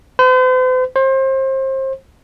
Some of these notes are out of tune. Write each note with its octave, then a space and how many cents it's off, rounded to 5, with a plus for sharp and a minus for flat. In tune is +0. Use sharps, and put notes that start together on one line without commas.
C5 -45
C5 +30